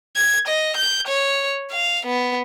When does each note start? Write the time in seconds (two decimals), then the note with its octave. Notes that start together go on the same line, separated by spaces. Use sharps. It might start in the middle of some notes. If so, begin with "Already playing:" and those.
0.16 G#6
0.47 D#5
0.76 G6
1.07 C#5
1.71 F5
2.05 B3